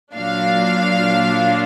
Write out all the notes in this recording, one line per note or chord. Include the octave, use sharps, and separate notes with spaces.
A#2 F#3 D4 F5